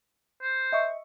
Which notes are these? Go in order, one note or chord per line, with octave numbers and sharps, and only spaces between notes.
C5
D#5 E5 C#6